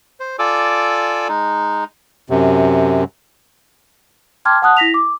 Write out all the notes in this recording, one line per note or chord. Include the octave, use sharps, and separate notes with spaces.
C5
F4 A4 D5 G#5 D6 E6
G#3 D#4
F#2 C3
G5 A5 C6 D6 F6 G#6
F#5 A5 D#6 F#6
E4 A#6 B6 F7
D6